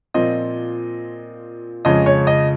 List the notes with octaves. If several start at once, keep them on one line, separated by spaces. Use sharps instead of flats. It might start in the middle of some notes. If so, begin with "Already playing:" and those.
A#2 F3 C4 D#5
F2 C#3 F3 G#3 C#4 D#5
C#5
D#5